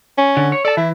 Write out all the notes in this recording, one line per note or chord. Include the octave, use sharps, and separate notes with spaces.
C#4
D3
C#5
A4 D5 A5
E3 E4